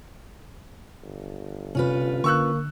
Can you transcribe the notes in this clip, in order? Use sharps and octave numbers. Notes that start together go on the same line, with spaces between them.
G1
C3 C#4 F4 B4
D3 A#3 C#6 E6 F#6